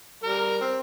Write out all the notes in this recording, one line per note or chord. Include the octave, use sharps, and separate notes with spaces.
G3 A#4
C4